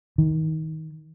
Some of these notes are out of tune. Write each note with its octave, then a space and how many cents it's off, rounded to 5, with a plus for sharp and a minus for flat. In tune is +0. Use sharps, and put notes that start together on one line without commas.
D#3 +25